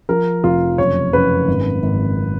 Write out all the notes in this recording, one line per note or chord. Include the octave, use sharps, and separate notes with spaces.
F3 A#4
F1 F4
F#1 C#5
F#1 B4
G#1
G#1